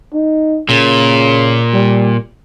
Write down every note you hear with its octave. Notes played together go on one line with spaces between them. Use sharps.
D#4
A#2 C#3
G3